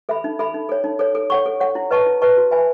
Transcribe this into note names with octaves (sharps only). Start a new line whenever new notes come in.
A4 E5 B5
D#4
A4 E5 B5
D#4
A4 C#5
D#4
A4 C#5
A4
C#5 F#5 C#6
A4
C#5 F#5 C#6
E4
B4 D#5 A5 C#6
E4
B4 D#5 A5 C#6
F#4
B4 E5 G#5 B5